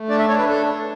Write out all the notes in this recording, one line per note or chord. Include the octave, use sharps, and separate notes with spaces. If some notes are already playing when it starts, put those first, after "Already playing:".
Already playing: A3
D4 D5
E5
D4 C#5
B4
A4